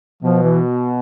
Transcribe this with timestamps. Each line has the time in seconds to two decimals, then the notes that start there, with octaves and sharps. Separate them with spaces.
0.23 B2 F3
0.43 E3